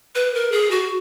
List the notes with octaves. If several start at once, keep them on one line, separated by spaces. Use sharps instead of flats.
B4
A#4
G#4
F#4